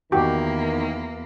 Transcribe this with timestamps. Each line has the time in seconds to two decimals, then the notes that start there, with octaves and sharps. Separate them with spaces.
0.12 E2 D#3 A#3 F#4 G4